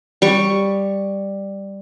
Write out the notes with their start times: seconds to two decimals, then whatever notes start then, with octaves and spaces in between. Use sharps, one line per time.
0.22 G3 C#6